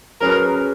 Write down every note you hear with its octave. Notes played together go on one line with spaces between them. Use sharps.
F#3 C#4 G#4 A#4 B4